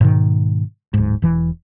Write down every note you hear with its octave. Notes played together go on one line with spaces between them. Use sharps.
G#2 B2 D#3
D1 G#2
E1 E3